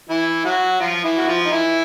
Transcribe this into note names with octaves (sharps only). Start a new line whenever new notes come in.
E3 E4
F#3 F#4
F3 F4
E3 E4
F#4
F3 F4
D#4
E3 E4